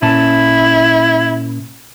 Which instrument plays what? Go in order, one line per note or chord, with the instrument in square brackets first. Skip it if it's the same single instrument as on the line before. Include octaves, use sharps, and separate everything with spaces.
[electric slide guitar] A#2 C#4 A5 [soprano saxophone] E4